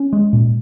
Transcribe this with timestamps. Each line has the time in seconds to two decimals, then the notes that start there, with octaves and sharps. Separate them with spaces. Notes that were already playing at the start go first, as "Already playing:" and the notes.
Already playing: C#4
0.13 G#3
0.33 A#2